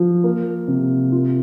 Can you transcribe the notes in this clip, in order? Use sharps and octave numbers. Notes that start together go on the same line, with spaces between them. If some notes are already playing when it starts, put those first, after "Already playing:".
Already playing: F3
A#3
C3
F4